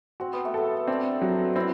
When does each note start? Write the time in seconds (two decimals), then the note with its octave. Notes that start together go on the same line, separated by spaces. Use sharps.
0.20 C4 F#4
0.33 B3
0.45 A3
0.54 B3 A4
0.88 C4 D4
1.22 F#3
1.56 C4 E4